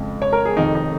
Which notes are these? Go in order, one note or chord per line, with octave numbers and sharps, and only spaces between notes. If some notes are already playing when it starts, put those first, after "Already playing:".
Already playing: F2 C#3 G#3
C#5
A#4
G#4
F1 F2 D#3 D#4
D#4